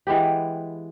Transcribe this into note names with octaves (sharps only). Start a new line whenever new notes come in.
E3 G#3 B3 G4